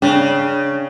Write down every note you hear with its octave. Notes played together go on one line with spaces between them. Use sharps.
C#3 D4 G5